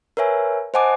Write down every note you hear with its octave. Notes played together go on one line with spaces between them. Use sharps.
A#4 B4 C#5 E5 G#5
C5 D#5 F#5 G#5 A5 D6